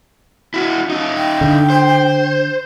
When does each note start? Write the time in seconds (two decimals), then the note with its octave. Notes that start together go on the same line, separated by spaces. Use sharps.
0.54 E4 F#4
0.90 D#4 F4
1.17 G5
1.41 D3
1.70 C5